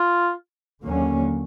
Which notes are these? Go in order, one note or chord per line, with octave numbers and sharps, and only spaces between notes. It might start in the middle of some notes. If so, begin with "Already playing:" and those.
Already playing: F4
D#2 D3 F#3 A#3 C#4